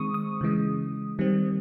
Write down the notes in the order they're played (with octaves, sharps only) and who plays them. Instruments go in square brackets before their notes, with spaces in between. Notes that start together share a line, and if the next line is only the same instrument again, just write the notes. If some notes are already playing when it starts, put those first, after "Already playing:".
Already playing: [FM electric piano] D#3 G#3 C4 C#6 D#6
D#6
C#3 E3 G#3
D#3 G3 C4